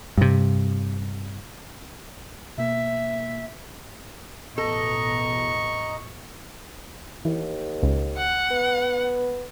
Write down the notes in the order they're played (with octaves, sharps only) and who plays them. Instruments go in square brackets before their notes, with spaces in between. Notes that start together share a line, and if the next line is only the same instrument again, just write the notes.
[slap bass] G2 C3
[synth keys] B2 A#3 [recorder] E5
[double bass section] A1 E2 B2 [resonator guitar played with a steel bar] A4 [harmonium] D#5 A#5 [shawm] C#6
[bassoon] D#2 [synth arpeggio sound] E3
[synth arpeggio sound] C#2
[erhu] F#5
[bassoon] B3